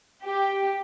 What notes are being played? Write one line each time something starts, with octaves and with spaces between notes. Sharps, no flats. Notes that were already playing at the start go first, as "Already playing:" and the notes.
G4